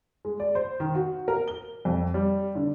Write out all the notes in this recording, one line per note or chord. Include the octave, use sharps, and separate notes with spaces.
G#3
D5
C5
D#3
F#4
A#4
G7
F2
G3
D3